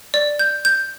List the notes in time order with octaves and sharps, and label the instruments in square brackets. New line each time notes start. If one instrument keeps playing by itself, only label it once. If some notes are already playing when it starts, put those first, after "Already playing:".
[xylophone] D5
G6
G6